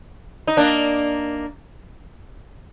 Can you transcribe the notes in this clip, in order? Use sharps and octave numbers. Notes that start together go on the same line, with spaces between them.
D#4
A#3 D4